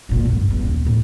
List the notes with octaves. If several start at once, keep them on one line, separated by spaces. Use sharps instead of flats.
D2 A#2
D2 G2
E2 G2
D#1 D#2
A2 A3